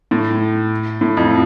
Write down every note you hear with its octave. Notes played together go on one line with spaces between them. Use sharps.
A2
A2
F2